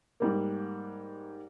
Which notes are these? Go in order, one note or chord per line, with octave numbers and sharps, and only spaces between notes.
G#2 G3 A#3